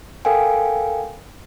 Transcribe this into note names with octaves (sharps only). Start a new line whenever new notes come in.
A4 A#4 F5 G5 G#5